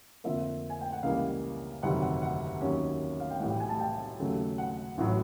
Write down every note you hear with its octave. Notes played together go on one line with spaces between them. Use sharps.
F2 D3 F3 A#3 E5
G#5
G5
F#5
C#2 C#3 E3 G3 A#3 F5
G1 F2 C3 D#3 F#3 F#5
F#5
F#5
D#2 D#3 F#3 A#3 C#4
F5
G5
B1 A2 E3 G3 F#5
G5
G#5
A5
G5
D#2 C#3 F#3 A3
F#5
A1 A2 F#3